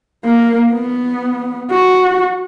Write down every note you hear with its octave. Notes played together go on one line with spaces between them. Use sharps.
A#3
B3
F#4